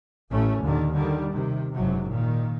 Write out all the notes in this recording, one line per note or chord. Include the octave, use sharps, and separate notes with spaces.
A1 A2 A3 C#4
D#2 A#2 D3 D#3
D3 D#3 G3
C3 D#3
F#1 G#2 C3 F#3
A#2 D#3